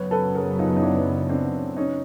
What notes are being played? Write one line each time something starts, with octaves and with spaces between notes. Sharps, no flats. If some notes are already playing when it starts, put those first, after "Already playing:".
Already playing: F#2 C#3 F#3 B3 B4 C#5
A4 B4
G#4 A#4
D#4 F4
D#4
D4 E4
C4 D4
C#4 D#4